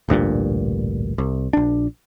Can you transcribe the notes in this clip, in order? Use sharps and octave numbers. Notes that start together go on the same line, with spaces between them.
A1 D2 G2 A#2
C2
A#1 D4